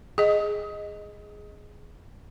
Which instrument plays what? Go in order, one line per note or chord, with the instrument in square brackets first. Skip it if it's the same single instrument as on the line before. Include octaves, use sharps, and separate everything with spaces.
[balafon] G#4 D#5